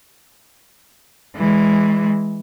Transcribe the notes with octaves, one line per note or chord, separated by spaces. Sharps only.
E3 G#3